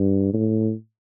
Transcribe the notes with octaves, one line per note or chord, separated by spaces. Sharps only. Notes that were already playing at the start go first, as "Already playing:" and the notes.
Already playing: G2
A2